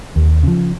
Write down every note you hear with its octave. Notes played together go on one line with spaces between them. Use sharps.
D#2
C#3 F3